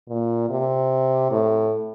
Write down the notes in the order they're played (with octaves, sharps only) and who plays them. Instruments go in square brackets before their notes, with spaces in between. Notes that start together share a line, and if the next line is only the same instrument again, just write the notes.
[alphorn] A#2
C3
A2